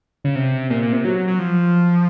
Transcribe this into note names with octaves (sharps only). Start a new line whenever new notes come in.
C#3
C3
A#2
A#2
C3
F#3
F#3
F3